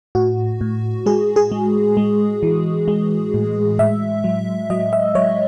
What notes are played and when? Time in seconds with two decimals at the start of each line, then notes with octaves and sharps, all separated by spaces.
0.15 A2 F#4
0.61 A2
1.06 G#3 G#4
1.36 G#4
1.52 G#3
1.97 G#3
2.43 E3
2.88 G#3
3.34 A2
3.79 A2 E5
4.24 F#3
4.70 F#3 D#5
4.93 E5
5.15 F#3 C#5